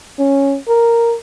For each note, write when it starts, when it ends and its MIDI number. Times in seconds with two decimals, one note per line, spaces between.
0.19 0.57 61
0.68 1.15 70